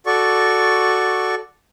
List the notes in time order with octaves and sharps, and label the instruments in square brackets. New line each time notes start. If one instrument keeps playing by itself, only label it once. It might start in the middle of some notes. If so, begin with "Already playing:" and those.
[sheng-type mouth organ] F#4 A4 D5 C#6